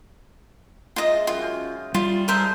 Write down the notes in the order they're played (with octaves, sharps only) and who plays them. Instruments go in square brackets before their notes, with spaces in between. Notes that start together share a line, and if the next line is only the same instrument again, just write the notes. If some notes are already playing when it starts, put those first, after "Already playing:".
[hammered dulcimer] G#3 D#4 E5 [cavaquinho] F4 D#5
[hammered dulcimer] F#2 F#5 G5 [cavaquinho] F4
[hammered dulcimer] C#4 G5
[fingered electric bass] G3 [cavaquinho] F4
[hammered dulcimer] G#4 A5 [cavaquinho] A#4 C5 E5